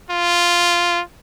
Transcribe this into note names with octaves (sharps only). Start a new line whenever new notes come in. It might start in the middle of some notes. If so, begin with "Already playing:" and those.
F4